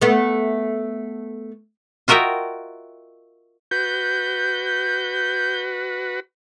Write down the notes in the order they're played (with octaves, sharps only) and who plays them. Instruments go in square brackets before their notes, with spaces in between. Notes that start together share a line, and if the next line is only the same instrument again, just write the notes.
[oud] A3 B3
[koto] F4 F#4 A#4 D#5 E5 G5
[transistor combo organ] F#4 B4 [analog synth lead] G6